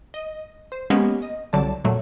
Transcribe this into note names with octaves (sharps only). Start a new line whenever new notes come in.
D#5
C5
G#3 A#3 B3 C#4 G4
D#5
C2 D3 F#3 D5 A5
F2 A#2 F#3 A3